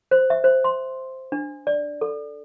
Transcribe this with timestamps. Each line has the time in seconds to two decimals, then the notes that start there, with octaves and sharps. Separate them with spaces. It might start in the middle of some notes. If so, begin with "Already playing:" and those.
0.11 C5
0.30 E5
0.44 C5
0.64 C6
1.32 D4
1.67 D5
2.01 A4